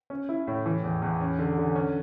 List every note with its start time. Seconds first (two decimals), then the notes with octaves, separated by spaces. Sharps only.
0.10 C#4
0.29 E4
0.47 A2
0.66 E3
0.83 E2
1.02 E2
1.21 C#4
1.39 D3
1.58 D3
1.76 C#4